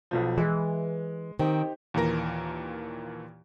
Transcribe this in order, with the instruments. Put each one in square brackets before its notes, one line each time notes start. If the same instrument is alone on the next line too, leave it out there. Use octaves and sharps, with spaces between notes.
[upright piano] B1 B2 F3
[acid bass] E3 [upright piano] G#3
[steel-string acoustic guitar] D#3 C4 [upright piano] D#4 G4 C5
[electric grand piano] D#2 A#2 E3 A#4 A#6